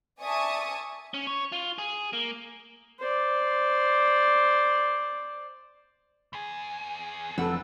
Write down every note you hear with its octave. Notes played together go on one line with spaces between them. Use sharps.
D5 E5 G#5 A5 C#6 D#6
C#4
C#5
F4
G#4
A#3
C5 D5
E2 G#4
F1 F2 A4 F#5 E6